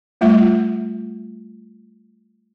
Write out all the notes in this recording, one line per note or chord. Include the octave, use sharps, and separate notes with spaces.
G3 A3 F4 E5